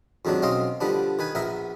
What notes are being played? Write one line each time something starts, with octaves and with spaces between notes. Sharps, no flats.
F2 G#2 D#3 F#3 D4
B1 C4 C#4 D#5 F5 C6
D3 F3 G3 B3 D4
D#3 B4 G#5
A#1 B3 A#4 E5